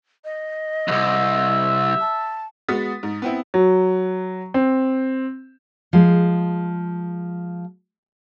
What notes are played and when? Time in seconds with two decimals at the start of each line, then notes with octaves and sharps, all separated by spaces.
0.25 D#5
0.88 C2 F2 E5
2.01 A5
2.68 G#3 B3 F#4 D#6 A6 B6
3.03 G#2
3.22 B3 C4 E4
3.54 F#3
4.54 C4
5.93 F3 G#3